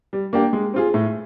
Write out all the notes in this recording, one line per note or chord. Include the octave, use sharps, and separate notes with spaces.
G3
A#3 D4 G4
G#3
C4 F4 G#4
A2